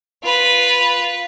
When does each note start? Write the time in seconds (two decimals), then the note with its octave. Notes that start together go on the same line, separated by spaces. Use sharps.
0.23 F4 B4